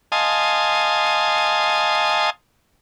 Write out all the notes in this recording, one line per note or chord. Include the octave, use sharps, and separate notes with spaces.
D#5 F5 G#5 A5 C6 D#6